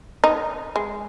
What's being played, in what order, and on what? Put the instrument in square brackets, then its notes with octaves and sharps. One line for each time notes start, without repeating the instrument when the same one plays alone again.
[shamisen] D#4
G#3